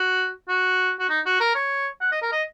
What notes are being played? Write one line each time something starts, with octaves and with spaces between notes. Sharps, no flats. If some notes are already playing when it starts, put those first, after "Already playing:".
Already playing: F#4
F#4
F#4
D#4
F#4
A#4
C#5
F#5
D#5
A#4
D#5